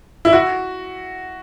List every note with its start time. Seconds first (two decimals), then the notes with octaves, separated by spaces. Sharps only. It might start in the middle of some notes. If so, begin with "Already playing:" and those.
0.25 E4
0.33 F#4